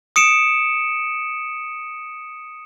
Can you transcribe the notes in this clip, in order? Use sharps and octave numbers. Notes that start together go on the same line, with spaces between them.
D#6 C#7 D7 E7